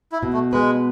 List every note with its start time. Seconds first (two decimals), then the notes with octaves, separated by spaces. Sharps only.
0.12 E4
0.23 B2
0.33 A3
0.53 G#3 B4